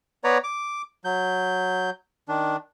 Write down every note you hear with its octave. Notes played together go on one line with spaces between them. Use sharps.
B3 B4 C#5 D5 A#5
D6
F#3 G6
D#3 D4